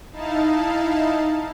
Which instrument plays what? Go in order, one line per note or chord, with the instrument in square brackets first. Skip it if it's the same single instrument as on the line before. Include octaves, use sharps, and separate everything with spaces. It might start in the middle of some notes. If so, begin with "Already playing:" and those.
[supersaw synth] D#4 E4 F5 A5